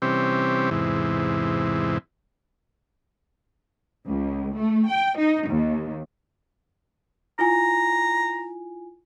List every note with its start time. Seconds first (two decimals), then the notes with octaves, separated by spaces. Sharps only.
0.02 C3 E3 G3 C4 C#4 G4
0.71 E2 G#2 C3 E3
4.08 C#2
4.57 A3
4.89 G5
5.18 D#4
5.49 D#2
7.39 E4 F4 G#5 A#5